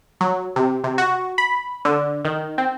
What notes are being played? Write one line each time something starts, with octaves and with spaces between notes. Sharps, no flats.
F#3
C3
C3
F#4
B5
D3
D#3
C4